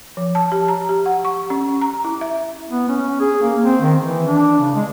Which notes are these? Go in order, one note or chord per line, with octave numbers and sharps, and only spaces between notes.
F3
A5
G4
A#5
G4
F#5
C#6
C#4
A#5
E4
E5
B3
C#4
G#4
A#3
C4
D#3
E3
D4
C#3
G#3